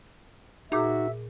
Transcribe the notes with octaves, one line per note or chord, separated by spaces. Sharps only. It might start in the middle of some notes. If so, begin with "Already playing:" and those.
A#2 D#4 F#4 G#4 E5